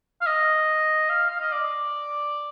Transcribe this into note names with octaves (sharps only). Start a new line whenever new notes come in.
F5
D#5
F5
F5
D#5
D5